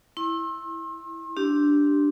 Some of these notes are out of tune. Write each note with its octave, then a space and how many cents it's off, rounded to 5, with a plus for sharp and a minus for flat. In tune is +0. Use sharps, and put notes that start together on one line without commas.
E4 +0 C6 +40
D4 -5 G4 -10 C6 +10